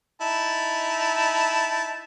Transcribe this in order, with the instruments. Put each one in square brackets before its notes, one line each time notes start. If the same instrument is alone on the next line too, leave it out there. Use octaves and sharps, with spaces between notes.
[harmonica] D#4 E4 A5